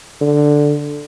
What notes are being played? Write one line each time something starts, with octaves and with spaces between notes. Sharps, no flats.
D3